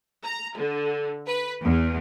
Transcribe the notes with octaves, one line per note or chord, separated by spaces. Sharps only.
A#5
D3
B4
E2